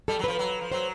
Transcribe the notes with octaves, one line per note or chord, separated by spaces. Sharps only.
G3 A4
F#3
F3 B4
F#3
F3
F#3 C5